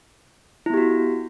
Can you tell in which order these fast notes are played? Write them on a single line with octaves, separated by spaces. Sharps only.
E4 B3 G4 F#4